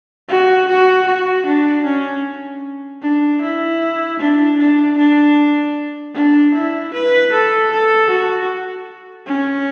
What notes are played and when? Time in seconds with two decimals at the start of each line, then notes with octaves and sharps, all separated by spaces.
0.29 F#4
0.68 F#4
1.06 F#4
1.46 D4
1.85 C#4
3.02 D4
3.41 E4
4.20 D4
4.58 D4
4.97 D4
6.14 D4
6.54 E4
6.93 B4
7.32 A4
7.71 A4
8.10 F#4
9.27 C#4